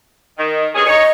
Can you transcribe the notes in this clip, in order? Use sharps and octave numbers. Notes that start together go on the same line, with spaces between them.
D#3
G2 C#4 G#4
D#4 C#5 D#5